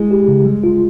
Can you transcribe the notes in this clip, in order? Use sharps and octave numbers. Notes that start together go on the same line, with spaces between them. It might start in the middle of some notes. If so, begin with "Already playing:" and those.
Already playing: G#3 E4
G4
C#3
G3
F4